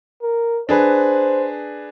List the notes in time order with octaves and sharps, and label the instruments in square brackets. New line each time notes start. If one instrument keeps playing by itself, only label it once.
[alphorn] A#4
[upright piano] D4 G#4 B4 [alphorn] C5